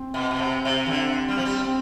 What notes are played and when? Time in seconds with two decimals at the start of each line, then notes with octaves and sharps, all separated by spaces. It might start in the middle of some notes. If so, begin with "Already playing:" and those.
Already playing: C4
0.14 B2
0.31 B2
0.39 C3
0.65 C3
0.86 E3
0.91 D3
1.29 G3
1.37 F3
1.45 G3
1.66 C4